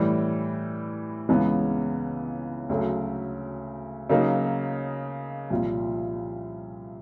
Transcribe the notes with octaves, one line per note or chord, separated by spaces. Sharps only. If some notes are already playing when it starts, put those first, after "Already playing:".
Already playing: A2 E3 G3
C#2 C#3 E3 G#3 B3
D2 C#3 F#3 A3
C#3 F#3 A#3 D#4
C2 A#2 F3